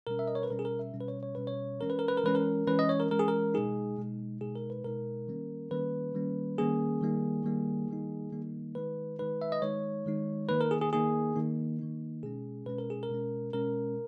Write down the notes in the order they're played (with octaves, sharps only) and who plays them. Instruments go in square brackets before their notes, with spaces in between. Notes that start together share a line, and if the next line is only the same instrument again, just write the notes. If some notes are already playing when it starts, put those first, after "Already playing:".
[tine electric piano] B2 G3 C#4 A#4
E5
D#5
C#5
B4
B2 G3 C#4 A#4
G#4
A#4
E5
B2 G3 C#4
B4
C#5
C#5
B2 G3 C#4 B4
C#5
E3 G#3 C#4 A#4
B4
A#4
B4
A#4
E3 G#3 C#4 B4
A#4
E3 G#3 C#4 B4
D#5
C#5
A#4
E3 G#3 C#4 A#4
G#4
A#4
B2 G#3 D#4 G#4
B2 G#3 D#4
B2 G#3 D#4 G#4
A#4
B4
B2 G#3 D#4 A#4
D#3 G3 A#3 C#4
D#3 G3 A#3 C#4 B4
D#3 G3 A#3 C#4
D#3 G3 A#3 C#4 G#4
D#3 G3 A#3 D#4
D#3 G3 A#3 D#4
D#3 G3 A#3 D#4
D#3 G3 A#3 D#4
D#3 G#3 D#4 B4
D#3 G#3 D#4 B4
E5
D#5
D#3 G#3 D#4 C#5
D#3 G#3 D#4
D#3 A#3 D#4 B4
A#4
G#4
G#4
D#3 A#3 D#4 G#4
D#3 A#3 D#4
D#3 A#3 D#4
B2 G#3 C#4 G#4
B2 G#3 C#4 B4
A#4
G#4
A#4
B2 G#3 C#4
B2 G#3 C#4 A#4